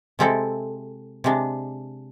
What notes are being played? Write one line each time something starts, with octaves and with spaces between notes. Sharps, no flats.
C3 G#3 C4 E4 A4
C3 G#3 D4